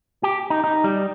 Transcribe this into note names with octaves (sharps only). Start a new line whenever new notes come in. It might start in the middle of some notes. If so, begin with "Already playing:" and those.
G4
D#4
D#4
G3